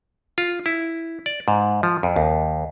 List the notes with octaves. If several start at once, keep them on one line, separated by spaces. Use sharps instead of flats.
F4
E4
D5
G#2
F3
F2
D#2